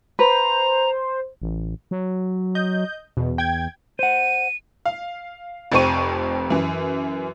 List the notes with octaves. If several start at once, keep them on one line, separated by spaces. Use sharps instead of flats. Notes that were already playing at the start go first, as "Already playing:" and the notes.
B4 C5 A#5
A1
F#3
D#5 G6
E2 B2
G5 G#6
C5 F#5 D#7
F5
F1 F2 C5 G5 C#6 D#7
F#2 E3